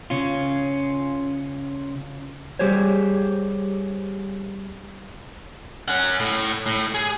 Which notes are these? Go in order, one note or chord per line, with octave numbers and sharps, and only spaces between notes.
C#3 C#4 F4
G3 G4 G#4 C5 C#5
C#4 F#5
A2
A2
G#4